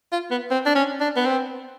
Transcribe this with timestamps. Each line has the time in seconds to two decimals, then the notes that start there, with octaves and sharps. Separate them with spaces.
0.12 F4
0.31 B3
0.51 C4
0.66 D4
0.75 C#4
1.01 D4
1.16 B3
1.26 C4